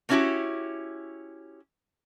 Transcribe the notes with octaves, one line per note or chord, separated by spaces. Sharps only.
A3 A#3 C#4 E4 F#4 G4